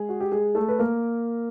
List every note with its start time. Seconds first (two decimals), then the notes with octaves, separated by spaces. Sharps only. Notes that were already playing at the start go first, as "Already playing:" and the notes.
Already playing: G#3 G#4
0.09 F#4
0.20 G4
0.32 G#3 G#4
0.55 A3 A4
0.69 B4
0.79 A#3 A#4